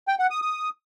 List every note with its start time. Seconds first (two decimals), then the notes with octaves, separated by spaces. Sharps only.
0.08 G5
0.19 F#5
0.30 D#6
0.42 D#6